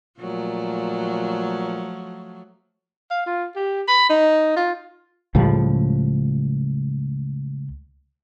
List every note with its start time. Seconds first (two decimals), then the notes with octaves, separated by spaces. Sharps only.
0.20 A#2 F3 F#3 A3
3.11 F5
3.26 F4
3.56 G4
3.88 B5
4.10 D#4
4.57 F4
5.35 C#2 A2 F3 G3